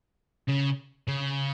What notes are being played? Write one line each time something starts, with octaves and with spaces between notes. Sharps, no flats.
C#3
C#3